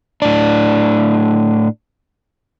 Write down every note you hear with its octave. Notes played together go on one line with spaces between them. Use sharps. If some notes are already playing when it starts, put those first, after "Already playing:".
A2 D4